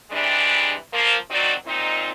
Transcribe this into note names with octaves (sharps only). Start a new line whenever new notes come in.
C3 E3 G3 G#3 D4
F3 A#3
D#3 F#3 C4 D#4 F#4 D5
A#2 C4 D#4